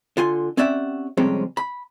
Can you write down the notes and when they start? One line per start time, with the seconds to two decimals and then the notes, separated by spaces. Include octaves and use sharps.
0.17 D3 F4 G#5 C6
0.57 C4 C#4 G4 D5 E5 F#5
1.17 F2 C3 G3 G#3 C4 C#4
1.57 B5